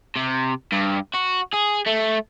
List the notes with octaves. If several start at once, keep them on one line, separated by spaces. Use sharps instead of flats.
C3
G2
F#4
G#4
A3